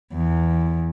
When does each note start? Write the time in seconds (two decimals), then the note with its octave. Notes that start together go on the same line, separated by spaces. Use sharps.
0.14 E2